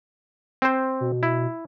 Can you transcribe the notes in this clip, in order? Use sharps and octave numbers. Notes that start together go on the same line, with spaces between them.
C4 C5
B2
E4